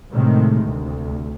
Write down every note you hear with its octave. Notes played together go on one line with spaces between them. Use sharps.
A2 C3 D#3 G#3 A3
D2 C3